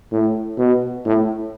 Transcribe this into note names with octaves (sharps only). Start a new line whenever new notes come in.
A2
B2
A2